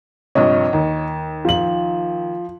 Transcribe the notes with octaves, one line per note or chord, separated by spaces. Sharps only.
A#1 G2 C3 C#5 D#5
D#2
F3 F#7